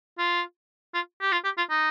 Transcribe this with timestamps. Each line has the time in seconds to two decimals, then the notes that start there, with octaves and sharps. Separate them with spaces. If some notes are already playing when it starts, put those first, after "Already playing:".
0.18 F4
0.94 F4
1.21 G4
1.32 F4
1.44 G4
1.57 F4
1.70 D#4